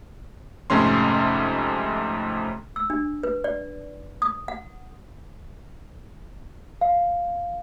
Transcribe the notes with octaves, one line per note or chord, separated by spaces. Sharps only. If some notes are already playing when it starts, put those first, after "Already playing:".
F2 G#2 C3 A3 C#4 C6
E6
D4
B4
D5
D#6
F#5
F5